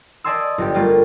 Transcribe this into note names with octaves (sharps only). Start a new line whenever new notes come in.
D5 D#5 G#5 A5 C6 E6
G1 G2 G4
G3 A3 A#3 F4